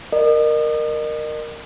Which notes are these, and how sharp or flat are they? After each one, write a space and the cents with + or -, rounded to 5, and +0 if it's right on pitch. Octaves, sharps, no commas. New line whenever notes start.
A#4 +0 D#5 -40